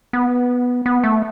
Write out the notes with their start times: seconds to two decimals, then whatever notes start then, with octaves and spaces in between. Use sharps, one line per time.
0.13 B3
0.86 B3
1.04 A3